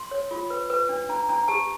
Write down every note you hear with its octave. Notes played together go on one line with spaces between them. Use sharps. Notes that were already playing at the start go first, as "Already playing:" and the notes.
Already playing: C6
C#5
F4
B4
B4
D4
D4 A#5
D4 A#5
G4 A5